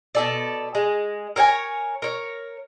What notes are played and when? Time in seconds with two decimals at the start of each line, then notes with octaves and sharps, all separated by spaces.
0.15 B2 A4 D5
0.75 G#3
1.36 A#4 C#5 F#5 G#5
2.02 A#4 C#5